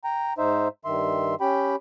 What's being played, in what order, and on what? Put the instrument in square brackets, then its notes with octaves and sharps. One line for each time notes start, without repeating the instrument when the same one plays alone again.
[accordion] G5 A#5
G#2 D#4 C5 E5
G2 D#3 E5 C6
C#4 G4 G5 B5